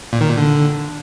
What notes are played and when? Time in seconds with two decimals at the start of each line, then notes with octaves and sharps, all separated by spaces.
0.13 A#2
0.21 D#3
0.29 A#2
0.37 D3